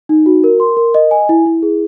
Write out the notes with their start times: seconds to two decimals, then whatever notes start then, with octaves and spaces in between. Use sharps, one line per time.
0.09 D#4
0.26 F#4
0.44 A#4
0.60 C6
0.77 A#4
0.94 D#5
1.11 G#5
1.29 E4
1.46 E4
1.62 G#4